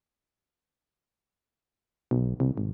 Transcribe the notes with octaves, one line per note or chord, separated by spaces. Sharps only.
B1
C2
G#1